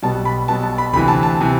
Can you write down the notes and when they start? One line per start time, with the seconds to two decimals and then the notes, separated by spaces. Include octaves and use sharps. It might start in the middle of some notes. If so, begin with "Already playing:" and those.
0.02 B1 B2 G3 B3 A5
0.25 B5
0.48 B1 B2 G3 B3 A5
0.63 A5
0.78 B5
0.93 D2 C3 E3 B5
1.08 A5
1.23 A5
1.41 C3 E3